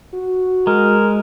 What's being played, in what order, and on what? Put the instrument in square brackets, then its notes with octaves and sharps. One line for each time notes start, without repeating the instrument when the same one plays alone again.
[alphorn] F#4
[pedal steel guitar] G#3 [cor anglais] A#4